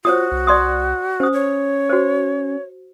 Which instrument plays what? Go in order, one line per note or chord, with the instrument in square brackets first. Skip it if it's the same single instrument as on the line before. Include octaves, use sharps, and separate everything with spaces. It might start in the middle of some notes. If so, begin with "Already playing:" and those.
[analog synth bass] F4 [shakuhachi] F#4 [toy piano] C5 C#5 D#6
[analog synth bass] C2
[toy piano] D5 C6 D#6
[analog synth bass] C#4 [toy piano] C5 D#6
[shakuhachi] C#5
[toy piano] F#4 C5